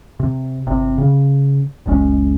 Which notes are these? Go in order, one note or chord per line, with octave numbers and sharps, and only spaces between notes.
C3
G1 C3 C4
C#3
F#1 C#2 G#3 C#4